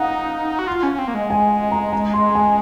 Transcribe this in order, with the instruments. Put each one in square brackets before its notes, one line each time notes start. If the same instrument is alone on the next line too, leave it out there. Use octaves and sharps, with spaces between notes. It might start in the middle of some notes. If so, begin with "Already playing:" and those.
Already playing: [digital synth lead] D#4 [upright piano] F5 F#5
[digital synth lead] F#4
F4
C#4
C4
A#3
G#3
[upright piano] G#5
A#5
A#5
C6
G#5